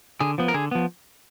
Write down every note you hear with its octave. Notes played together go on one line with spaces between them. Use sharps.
D3 G#4
F3 B3
A#4
D3 G#4
F3 B3